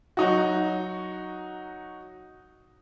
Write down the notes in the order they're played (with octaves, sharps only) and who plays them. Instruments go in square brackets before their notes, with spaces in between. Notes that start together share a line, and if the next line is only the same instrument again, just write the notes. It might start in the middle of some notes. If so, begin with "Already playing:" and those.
[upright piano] F#3 D#4 F#4